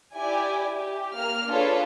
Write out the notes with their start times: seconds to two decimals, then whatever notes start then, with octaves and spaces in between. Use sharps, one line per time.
0.14 E4 G4 D5 G#5
0.74 G4
1.14 A#3 F6
1.49 D4 F4 G#4 A4 B4 C#5